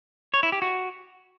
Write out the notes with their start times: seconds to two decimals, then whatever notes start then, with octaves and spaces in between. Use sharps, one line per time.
0.34 C#5
0.43 E4
0.52 G4
0.62 F#4